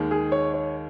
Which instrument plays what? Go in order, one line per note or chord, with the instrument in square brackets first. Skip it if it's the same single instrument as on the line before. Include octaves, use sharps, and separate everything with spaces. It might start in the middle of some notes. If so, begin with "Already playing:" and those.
Already playing: [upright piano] D#2 D#3 G#3
[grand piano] G#4
C#5
C#5